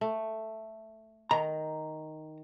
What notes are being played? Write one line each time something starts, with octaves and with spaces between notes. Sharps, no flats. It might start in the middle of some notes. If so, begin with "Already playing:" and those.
A3
D#3 A#5